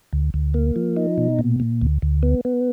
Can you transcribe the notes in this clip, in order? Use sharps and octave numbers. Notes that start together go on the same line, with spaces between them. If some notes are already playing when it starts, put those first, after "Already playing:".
D2
D2
A#3
F3
D#4
B2
A#2
A#2
D2
D2
B3
B3